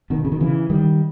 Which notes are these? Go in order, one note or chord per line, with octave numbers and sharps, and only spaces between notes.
B2 D#3
C#3
D#3
C#3 E3
D#3 G3